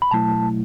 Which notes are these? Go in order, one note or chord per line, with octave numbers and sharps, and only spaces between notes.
B5
B2 F#3 A3 E4 A5